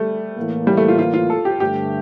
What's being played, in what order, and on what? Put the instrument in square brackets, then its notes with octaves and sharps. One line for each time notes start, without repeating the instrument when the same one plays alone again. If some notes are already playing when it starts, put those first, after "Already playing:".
Already playing: [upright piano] G3 A3
[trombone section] A2 E3 A#3
[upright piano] G3
A3
F4
F4
F4
A4
G4
[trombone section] G2 D3 A3 [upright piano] G4